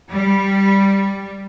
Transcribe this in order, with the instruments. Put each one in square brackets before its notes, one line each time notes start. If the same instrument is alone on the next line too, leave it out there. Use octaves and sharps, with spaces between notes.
[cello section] G3